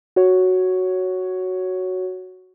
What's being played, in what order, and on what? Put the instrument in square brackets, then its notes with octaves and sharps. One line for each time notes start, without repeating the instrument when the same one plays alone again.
[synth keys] F#4 C#5